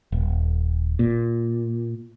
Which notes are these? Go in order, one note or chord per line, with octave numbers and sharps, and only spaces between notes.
D#1
A#2